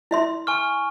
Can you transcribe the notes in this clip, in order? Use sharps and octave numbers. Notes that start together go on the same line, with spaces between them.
E4 E5 C6
G#5 C#6 F6